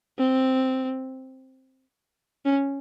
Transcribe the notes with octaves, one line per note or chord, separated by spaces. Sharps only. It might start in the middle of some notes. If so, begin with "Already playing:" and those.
C4
C#4